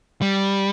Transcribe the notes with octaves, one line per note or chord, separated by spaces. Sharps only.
G3